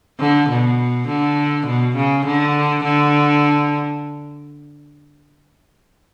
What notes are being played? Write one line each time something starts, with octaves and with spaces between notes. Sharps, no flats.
D3
B2
D3
B2
C#3
D3
D3